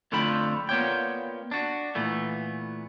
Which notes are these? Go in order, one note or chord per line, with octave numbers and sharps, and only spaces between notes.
F2 D3 A3 F4 G5 B5
A#3 B3 F4 C#5 D5 G5
D4 F#4
A#2 E3 A3 B3